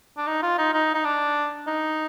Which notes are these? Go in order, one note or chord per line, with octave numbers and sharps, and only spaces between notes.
D4
D#4
F4
D#4
D#4
D#4
D4
D#4